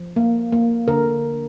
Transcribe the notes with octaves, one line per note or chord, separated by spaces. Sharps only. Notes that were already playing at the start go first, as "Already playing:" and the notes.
Already playing: F3
A#3
A#3
D3 A#4